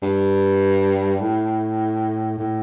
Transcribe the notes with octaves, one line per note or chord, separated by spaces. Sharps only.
G2
A2
A2